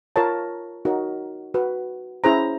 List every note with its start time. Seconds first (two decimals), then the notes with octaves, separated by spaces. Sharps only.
0.16 F4 A#4 C#5 A5
0.85 D#4 F#4 A#4 C#5
1.54 F#4 B4
2.24 C#4 E4 G#4 C5 A#5